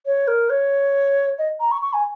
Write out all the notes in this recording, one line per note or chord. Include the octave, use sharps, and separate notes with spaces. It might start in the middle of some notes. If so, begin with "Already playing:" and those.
C#5
A#4
C#5
D#5
A#5
C#6
C#6
G#5